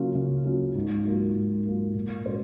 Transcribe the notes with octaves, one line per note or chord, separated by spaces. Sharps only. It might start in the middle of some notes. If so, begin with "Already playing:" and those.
Already playing: C#3 F#3 A#3 C#4 F4
C#3
F#3 A#3 C#4 F4
G#2
F#3 A#3 F4
G#2
F#3 A#3 F4
A#2
G#3 C#4 F#4 C5